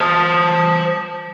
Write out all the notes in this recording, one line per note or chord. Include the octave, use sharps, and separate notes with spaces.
C5 A5